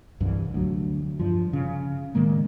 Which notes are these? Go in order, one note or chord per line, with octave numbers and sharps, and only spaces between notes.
C2 G2 E3
D2 F#3
G2 F3
C#3
A2 D#3 G#3 A#3